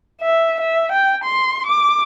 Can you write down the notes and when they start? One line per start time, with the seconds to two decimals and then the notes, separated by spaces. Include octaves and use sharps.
0.21 E5
0.60 E5
0.92 G5
1.24 C6
1.66 D6